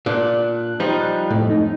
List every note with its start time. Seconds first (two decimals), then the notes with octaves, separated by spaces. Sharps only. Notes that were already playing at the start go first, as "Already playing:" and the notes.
0.06 A#2 D4 F#6
0.80 F3 G3 D#4
1.30 F2 A2
1.50 D#4